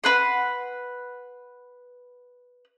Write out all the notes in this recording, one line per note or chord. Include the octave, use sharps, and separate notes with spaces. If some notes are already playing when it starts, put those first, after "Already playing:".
B4 F#5 C6